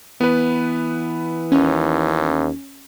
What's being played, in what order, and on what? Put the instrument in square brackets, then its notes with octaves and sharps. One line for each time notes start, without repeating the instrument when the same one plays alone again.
[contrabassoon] E3 [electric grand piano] B3 B4
[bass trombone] D#2 [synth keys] C#4